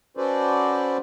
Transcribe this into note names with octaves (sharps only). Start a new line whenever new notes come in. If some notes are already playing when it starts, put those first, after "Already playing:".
C#4 F#4 A4 B4 C5 D5